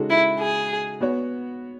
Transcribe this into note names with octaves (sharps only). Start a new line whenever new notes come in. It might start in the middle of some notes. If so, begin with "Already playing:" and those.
Already playing: C#3 G#3 D#4 F#4 A4
E4
G#4
B3 F#4 C#5